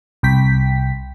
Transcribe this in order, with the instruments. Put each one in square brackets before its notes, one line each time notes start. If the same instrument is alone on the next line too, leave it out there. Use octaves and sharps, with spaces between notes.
[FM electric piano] C2 G5 B6